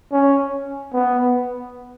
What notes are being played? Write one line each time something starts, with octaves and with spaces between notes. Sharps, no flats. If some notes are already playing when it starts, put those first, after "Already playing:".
C#4
B3